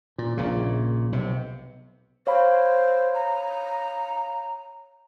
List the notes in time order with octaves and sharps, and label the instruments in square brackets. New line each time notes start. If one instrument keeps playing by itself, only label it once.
[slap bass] A#2
A#1 A#2 C#3
B1 C3
[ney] C5 [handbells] C#5 F5 B5
[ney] A#5